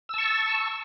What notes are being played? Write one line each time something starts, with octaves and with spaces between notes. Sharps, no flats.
A5 C#6 E6